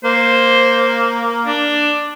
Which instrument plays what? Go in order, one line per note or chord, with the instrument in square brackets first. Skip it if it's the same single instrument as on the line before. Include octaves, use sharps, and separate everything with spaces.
[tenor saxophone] A#3 [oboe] C5
[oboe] D4